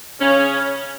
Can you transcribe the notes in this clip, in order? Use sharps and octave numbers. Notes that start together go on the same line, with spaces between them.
C#3 C#4